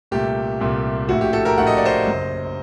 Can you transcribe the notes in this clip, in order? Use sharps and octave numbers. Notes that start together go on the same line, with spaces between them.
C2 A#2 A3 G4
C2 A#2 A3
A#1 A2 A3 F#4
G4
F#4 A4
G4 A#4
A#1 A2 A3 F#5
D#5
D5
C5 D#5
F#1 F#2 F#3